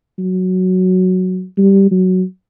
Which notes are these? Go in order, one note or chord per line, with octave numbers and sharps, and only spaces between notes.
F#3
G3
F#3